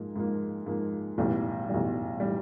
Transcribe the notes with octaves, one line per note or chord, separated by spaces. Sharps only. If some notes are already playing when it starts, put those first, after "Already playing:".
Already playing: G#2 F3 A#3
G#2 F3 A#3
G#2 F3 A#3
B1 A2 E3 G3
B1 A2 E3 G3
A2 E3 G3